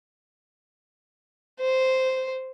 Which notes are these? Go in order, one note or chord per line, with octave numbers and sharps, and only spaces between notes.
C5